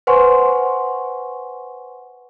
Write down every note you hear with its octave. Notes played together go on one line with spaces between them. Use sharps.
B4 C5 F#5 G#5 C6 C#6